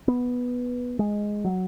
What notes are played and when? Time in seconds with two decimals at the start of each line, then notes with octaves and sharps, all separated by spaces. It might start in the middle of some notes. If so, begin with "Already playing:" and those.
0.08 B3
0.99 G#3
1.44 F#3